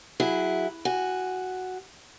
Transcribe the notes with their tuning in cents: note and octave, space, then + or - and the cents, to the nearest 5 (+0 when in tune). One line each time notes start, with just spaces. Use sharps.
F#3 +0 E4 +0 G#4 -15
F#4 +0 G#5 -10